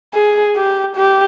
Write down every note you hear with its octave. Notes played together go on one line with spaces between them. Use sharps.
G#4
G4
G4